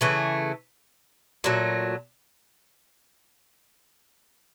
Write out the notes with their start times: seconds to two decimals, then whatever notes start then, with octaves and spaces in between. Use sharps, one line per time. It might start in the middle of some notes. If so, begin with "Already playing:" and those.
0.01 C#3 E3 A3
1.44 A#2 F#3 A3